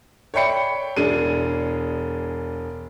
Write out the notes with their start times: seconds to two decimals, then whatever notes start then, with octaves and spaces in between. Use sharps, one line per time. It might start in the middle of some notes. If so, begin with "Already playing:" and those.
0.34 C#5 D5 E5 G5 B5 C#7
0.96 E1 D4 G#4 D#7